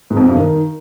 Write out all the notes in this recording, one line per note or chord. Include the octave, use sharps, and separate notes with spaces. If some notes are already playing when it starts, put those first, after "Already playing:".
G#2
F2
B2
G2
D#3